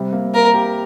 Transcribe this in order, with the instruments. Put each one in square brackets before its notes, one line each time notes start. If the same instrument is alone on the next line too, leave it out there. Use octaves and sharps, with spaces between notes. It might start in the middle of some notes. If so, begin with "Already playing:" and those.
Already playing: [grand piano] C3 G3
A#3
[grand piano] A#3 [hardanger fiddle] A#4
[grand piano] G4